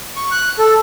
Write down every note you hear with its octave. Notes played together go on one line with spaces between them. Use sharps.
C#6
F#6
A4